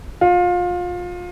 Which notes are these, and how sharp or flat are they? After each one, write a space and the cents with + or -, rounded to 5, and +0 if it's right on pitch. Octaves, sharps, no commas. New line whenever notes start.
F4 +25